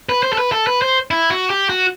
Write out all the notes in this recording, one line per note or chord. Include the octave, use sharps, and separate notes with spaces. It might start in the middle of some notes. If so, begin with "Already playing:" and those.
B4
C5
A4
B4
A4
B4
C5
E4
F#4
G4
F#4